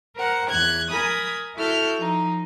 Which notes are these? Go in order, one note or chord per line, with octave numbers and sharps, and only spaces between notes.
A#4 C5 F#5
E2 F#6 G#6
A#4 G#5 B5 D#6
E4 F#4 A4 F6 G6
F3 D#4